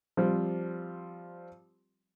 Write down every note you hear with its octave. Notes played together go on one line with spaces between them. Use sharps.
F3 G3 C4